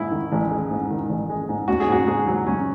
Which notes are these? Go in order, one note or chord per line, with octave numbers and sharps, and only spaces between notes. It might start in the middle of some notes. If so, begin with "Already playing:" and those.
Already playing: G#2 G#3 E4
D#3
A1
G#3
G#2
D#3
A1
G#3
G#2
C#4 F#4
G#4
G#2 F#4
G#2 G#4
F#3
C#4